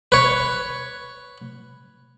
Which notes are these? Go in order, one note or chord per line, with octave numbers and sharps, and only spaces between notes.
B4 C#5